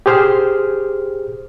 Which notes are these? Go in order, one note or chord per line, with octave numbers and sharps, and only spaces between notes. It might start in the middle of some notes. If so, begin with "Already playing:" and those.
G4 G#4 C5 F6